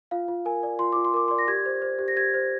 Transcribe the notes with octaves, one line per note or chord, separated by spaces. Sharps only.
F4 F5
F4
A#4 G#5
D5
F4 C6
F4 D6
C6
A#4 D6
C6
D5
A#6
G4 G#6
C5
C5
G4
A#6
G4 G#6
C5